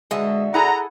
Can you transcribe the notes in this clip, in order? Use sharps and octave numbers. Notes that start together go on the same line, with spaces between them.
B2 D3 G#3 D#5 E5
E4 G#4 A4 F#5 A#5